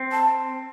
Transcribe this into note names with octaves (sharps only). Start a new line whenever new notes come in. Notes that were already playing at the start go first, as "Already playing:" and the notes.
Already playing: C4
A5